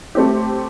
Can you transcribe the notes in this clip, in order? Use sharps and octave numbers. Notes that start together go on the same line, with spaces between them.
A3 C4 G4